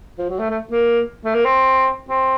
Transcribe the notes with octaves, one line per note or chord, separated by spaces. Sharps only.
F3
F#3
A3
A3
A#3
A3
A#3
C4
C4